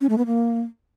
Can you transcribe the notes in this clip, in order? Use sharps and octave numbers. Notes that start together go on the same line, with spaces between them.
C#4
A3
B3
A#3